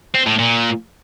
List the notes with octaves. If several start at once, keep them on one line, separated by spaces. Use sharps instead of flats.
C4
A2
A#2